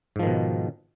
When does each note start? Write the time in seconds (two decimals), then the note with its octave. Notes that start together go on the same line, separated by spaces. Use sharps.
0.16 G#2
0.19 F3
0.23 D#3
0.27 B2